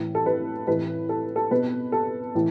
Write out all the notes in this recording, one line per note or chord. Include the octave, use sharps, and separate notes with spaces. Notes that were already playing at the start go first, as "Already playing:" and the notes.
Already playing: A2 E3
A4
B4
A2 E3 B4
A4
A4
B2 B4
A4
A2 E3